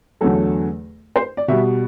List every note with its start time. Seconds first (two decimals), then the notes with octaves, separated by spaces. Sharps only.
0.21 E2 D3 F#3 A3 A4
1.16 C5
1.37 D5
1.48 B2 G3 E5